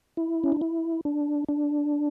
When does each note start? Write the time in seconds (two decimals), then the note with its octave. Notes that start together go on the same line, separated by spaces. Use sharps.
0.17 E4
0.44 C#4
0.52 D4
0.61 E4
1.05 D4
1.48 D4